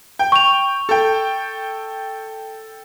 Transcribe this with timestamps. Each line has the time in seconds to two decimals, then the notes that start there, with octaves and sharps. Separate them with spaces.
0.19 G5
0.32 C#6 F7
0.89 A4 G5